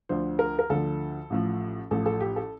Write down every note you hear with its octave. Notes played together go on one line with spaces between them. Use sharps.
D2 D3 F3 C5
A#4
A#4
D2 D3 F3 A4
A1 A2 F3
A1 A2 F3 A4
A4
G4
A4